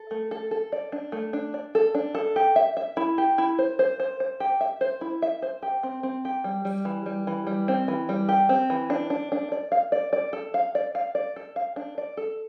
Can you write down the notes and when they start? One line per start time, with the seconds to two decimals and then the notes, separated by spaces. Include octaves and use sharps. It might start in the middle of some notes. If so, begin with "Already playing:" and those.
Already playing: A4
0.11 A3
0.31 A4
0.51 A4
0.72 D5
0.92 D4
1.12 A3
1.33 D4
1.54 D5
1.75 A4
1.95 D4
2.15 A4
2.36 G4
2.56 E5
2.77 E5
2.97 E4
3.18 G4
3.38 E4
3.59 C5
3.79 C5
4.00 C5
4.20 C5
4.40 G4
4.61 E5
4.81 C5
5.01 E4
5.22 E5
5.42 C5
5.63 G4
5.83 C4
6.03 C4
6.25 G4
6.44 G3
6.65 G3
6.85 E3
7.06 G3
7.27 E3
7.47 G3
7.68 C4
7.88 E3
8.09 G3
8.29 G4
8.49 C4
8.70 E3
8.90 D4
9.10 D4
9.32 D4
9.52 D5
9.72 F5
9.92 D5
10.13 D5
10.33 A4
10.54 F5
10.75 D5
10.95 F5
11.15 D5
11.36 A4
11.56 F5
11.76 D4
11.98 D5
12.17 A4